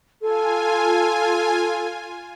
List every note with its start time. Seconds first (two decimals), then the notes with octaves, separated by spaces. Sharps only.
0.21 F4 A4 G#5